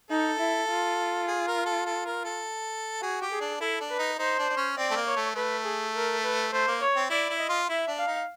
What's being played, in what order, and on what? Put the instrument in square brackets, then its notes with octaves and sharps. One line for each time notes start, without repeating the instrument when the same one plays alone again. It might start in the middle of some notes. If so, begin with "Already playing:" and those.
[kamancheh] D#4 [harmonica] A4
[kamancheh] E4
F4
[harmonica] G#4
A#4
A4
A4
A#4
A4
[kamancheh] F#4 [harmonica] G#4
[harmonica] G4
[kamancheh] G#4
[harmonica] D4
[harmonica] E4 [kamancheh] A4
[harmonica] D4
[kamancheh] B4
[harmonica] D#4
[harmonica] D#4 [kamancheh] C5
[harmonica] D4
D4
C#4
[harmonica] C4 [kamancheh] D5
[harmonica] A3
A#3
[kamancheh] C#5
[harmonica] A3
[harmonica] A3 [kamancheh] B4
[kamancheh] G#4
A#4
B4
[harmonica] A3 [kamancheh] C5
[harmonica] A#3
[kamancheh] C#5
[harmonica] C4
[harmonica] E4 [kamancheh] D5
[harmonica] E4
[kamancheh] D#5
[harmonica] F4
[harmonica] E4 [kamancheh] E5
[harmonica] D4
[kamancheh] F5
[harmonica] D#4